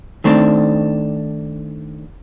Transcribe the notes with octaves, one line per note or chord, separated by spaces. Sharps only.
D#3 A3 C4 D4